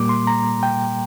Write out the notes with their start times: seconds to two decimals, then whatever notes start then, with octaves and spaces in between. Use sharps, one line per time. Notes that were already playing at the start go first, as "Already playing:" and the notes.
Already playing: A#2 G3 A#3 D6
0.09 C6
0.27 A#5
0.63 G5